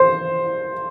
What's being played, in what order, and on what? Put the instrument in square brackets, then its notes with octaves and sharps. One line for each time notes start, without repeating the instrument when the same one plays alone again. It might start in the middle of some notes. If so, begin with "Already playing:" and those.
Already playing: [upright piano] C5